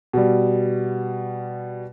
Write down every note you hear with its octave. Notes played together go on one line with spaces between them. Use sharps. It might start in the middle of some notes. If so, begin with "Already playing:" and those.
B2 G3